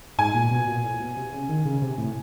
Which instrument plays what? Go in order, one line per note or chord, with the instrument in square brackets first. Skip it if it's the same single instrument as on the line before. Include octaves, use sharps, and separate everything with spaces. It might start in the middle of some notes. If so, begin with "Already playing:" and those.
[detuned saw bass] G#2 [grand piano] G#5
[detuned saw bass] A#2
B2
A#2
A2
B2
C3
C#3
D#3
C#3
C3
A2